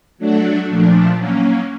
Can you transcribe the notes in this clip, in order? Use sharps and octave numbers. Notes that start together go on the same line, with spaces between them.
F#3 A3 D4 F#4
A#2 F3 A3 D4
F#3 A#3 C#4